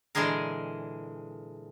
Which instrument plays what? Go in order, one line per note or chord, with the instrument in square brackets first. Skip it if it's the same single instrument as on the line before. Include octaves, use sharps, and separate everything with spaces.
[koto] A#2 D3 E3 G#3 G#4 A#4